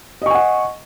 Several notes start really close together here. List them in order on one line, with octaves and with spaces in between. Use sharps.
D#5 C#6 G#5 F#5